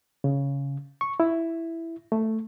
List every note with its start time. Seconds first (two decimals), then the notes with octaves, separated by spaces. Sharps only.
0.24 C#3
1.01 C#6
1.20 E4
2.12 A3